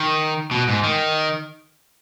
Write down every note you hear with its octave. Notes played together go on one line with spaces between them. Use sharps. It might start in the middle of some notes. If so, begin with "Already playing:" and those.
Already playing: D#3
B2
G#2
D#3